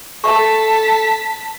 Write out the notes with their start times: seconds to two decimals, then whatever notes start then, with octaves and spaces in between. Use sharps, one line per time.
0.24 A4 A#4 E5 A5 C#6 B6